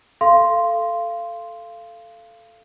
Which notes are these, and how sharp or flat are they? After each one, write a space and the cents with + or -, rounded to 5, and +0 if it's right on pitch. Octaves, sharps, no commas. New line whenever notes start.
A4 +0 F5 -25 C6 +0